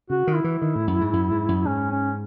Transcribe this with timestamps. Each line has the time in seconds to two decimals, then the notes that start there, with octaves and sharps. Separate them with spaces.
0.10 C#3 F#4
0.27 D#3
0.35 E4
0.44 E3
0.62 D#3
0.75 A2
0.87 F#2
1.01 G#2
1.13 F#2
1.31 G#2
1.48 F#2
1.65 G#2 C#4
1.91 C#4